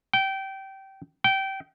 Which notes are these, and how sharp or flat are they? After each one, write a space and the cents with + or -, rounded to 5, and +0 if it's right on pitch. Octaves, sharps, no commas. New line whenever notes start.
G5 -20
G5 -20